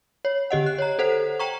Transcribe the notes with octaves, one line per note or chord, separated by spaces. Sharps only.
C#5
D3 G4 D#5 F#5
F#6
C#5 A#5
A4 C5 F#5
G5 A#5 C#6